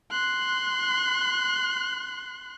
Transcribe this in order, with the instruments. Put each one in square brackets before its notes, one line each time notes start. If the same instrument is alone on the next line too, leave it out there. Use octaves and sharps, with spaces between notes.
[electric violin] C6 F#6